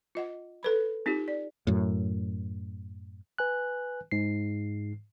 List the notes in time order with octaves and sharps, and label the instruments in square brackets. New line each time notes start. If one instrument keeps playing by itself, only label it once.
[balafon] F4 D#5 F#5
A4 B4 B5
C4 D#4 F4 G4
D5
[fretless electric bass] F#2 A2
[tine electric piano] B4 G#5 F#6
G#2 C7